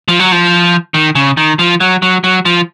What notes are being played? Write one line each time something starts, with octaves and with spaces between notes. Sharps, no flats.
F3
F#3
F3
D#3
C#3
D#3
F3
F#3
F#3
F#3
F3